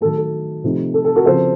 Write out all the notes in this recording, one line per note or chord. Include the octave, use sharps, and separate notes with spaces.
D#3 F#3 A3 A4
A4
C3 F3 A3 D#4
A4
A4
F#4 A#4
C#3 F3 C4 A4 C5